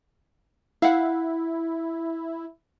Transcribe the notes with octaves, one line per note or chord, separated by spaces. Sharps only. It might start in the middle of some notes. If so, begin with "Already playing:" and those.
E4 F5 F#5